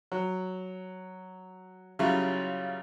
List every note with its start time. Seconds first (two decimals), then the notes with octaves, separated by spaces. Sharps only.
0.12 F#3
1.99 C#3 F#3 G3 E4 F4